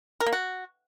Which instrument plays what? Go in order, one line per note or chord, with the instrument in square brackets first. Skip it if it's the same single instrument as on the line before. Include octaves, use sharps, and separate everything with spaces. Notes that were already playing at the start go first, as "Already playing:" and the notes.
[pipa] A#4
A#3
F#4